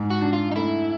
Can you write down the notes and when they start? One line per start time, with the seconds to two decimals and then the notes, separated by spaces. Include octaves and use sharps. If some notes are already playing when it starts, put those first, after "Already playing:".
Already playing: G#2
0.10 F#4
0.21 D4
0.33 F4
0.51 D#4
0.56 A3 E4